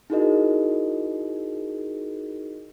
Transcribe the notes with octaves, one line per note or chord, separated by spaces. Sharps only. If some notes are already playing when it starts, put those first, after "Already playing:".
D#4 E4 F#4 G#4 A#4 D#5